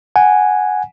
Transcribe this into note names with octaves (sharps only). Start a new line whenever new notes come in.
F#5 G#5